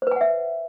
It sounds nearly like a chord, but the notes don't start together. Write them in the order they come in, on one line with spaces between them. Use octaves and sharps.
C5 B4 G#5 F#5 E5